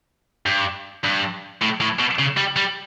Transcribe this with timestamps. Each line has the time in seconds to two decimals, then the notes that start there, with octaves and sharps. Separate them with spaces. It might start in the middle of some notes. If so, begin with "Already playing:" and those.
0.46 G2
1.04 G2
1.62 A2
1.80 A2
1.99 B2
2.19 C#3
2.37 G3
2.56 G3